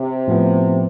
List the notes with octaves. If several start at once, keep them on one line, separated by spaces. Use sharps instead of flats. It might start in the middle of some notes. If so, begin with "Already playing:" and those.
Already playing: C3
A2 F3 B3